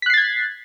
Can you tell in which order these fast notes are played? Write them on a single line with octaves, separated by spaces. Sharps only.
B6 F#6 C7 A6 G#6